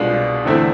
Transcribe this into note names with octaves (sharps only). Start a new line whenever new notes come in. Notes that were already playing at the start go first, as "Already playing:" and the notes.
Already playing: C2 B2 G#3 D4 F4
E2 D3 A3 C4 E4